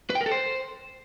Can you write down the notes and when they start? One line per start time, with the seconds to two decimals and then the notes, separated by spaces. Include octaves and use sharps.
0.10 B4
0.15 G5
0.21 A#4
0.26 A4
0.31 C5